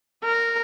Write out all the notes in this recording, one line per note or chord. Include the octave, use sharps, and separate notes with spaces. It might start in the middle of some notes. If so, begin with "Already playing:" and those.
A#4